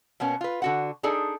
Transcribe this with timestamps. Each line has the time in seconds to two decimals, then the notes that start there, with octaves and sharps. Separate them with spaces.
0.20 B2 A#3 B3 C#4
0.41 F4 B4
0.62 D3 F#4 F#5
1.03 D4 D#4 G#4 A4 D5